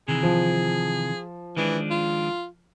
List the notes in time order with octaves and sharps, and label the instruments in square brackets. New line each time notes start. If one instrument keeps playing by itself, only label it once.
[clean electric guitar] C3 D#3 E3 [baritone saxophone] G#4
[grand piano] F3
[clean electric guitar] D#3 G#3 D4 [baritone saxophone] E3
[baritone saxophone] F4